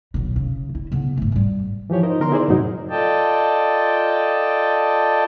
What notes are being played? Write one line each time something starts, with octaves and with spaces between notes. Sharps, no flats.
B1 B2
C#3
E4
C#3 B3
G#2 A3
G#2 G3
E3 F3 G4 C#5
D#4 A#4 C5 D#5
D3 B3 A#4 A#5 C6
D#4 E4 G#4 C5 D5
F#2 A2 C3 F#3 D#4
F4 A4 D5 D#5 G5 A5